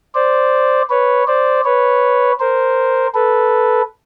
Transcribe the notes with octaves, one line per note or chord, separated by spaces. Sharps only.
C5 D5
B4 C#5
C5 D5
B4 C#5
A#4 C5
A4 B4